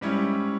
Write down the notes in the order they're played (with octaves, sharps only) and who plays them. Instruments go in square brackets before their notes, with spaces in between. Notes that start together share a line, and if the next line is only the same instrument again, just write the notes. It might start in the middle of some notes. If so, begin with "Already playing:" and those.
[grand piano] G#2 G3 C#4 E4